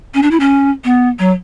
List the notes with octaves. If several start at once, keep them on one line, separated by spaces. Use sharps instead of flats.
C#4
D4
E4
C#4
B3
F#3